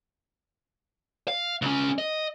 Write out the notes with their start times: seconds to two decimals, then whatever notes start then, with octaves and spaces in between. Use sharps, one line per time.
1.28 F5
1.62 C#2 C#4
1.98 D#5